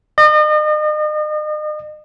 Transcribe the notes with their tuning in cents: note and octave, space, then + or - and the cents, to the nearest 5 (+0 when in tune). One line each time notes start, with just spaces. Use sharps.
D#5 -40